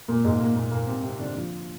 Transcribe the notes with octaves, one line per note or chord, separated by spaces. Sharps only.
A#2 A#3
G#2 G#3
A#2 A#3
A#2 A#3
A#2 A#3
C3 C4
C3 C4
D3 D4
F3